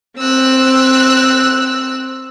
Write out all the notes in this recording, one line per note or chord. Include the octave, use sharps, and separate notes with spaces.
C4 E6 F#6